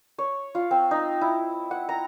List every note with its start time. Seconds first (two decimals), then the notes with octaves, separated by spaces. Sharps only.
0.18 C#5
0.55 F4
0.71 C4
0.91 D#4
1.21 E4
1.71 F#5
1.89 A#5